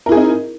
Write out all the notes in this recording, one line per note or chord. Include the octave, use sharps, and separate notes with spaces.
C4 D#4 E4 G#4 A#4